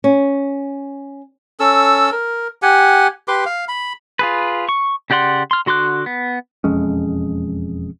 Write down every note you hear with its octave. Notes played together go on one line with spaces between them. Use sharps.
C#4
C#4 A4 E6
A#4
G4 F#5 G#5
G4 B4 C6 D6
F5
B5
F4 G#4 B4
C#6
C#3 G4 D5 F#5 C6
C6 F6
D3 F#4 C6 D6 F#6
B3
E1 F2 G#3 C#4